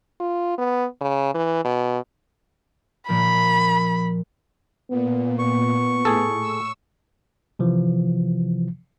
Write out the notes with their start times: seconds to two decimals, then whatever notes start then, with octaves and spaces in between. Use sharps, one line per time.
0.20 F4
0.58 B3
1.01 C#3
1.34 E3
1.65 B2
3.09 A#2 F3 A#3 B5
4.90 A#2 B3
5.39 B3 C#6
6.05 A2 G#4 A4
6.41 E6
7.59 C3 E3 F3